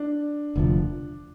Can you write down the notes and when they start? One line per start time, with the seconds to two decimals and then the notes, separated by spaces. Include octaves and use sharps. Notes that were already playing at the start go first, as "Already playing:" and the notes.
Already playing: D4
0.55 E1 D2 C3 F3